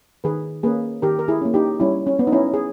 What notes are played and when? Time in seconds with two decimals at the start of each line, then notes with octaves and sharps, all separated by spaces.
0.24 D#3 G#4 B4
0.63 A#3 C#4 G#4 B4
1.02 D#3 G4 A#4
1.19 A#4
1.28 E4 G#4
1.41 A#3 C#4
1.54 D#4 G4
1.80 G3 C#4 E4
2.07 C#4
2.19 B3
2.27 D#4
2.32 C#4 E4
2.54 G#4